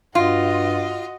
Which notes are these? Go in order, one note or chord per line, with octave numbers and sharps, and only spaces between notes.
G2 F4 F#4 D#5